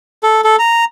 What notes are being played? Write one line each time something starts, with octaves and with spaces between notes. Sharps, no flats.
A4
A4
A#5